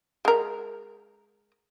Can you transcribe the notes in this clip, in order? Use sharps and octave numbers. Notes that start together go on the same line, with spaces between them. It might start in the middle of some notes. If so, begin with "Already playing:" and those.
G#3 A#4